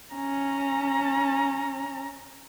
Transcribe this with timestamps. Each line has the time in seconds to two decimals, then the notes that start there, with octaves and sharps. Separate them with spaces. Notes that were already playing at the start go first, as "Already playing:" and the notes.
0.14 C#4 A#5